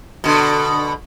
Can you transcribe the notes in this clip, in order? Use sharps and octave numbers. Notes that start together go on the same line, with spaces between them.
B2 D3